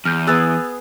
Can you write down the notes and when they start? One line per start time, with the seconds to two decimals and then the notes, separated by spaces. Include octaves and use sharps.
0.05 E2 F6 G6
0.27 B3 G#4 E6 F#6 A6